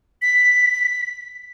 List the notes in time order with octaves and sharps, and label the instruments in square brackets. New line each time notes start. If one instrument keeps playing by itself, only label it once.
[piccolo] B6